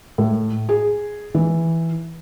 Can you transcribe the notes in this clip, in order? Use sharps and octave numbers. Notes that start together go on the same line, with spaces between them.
A2
G#4
E3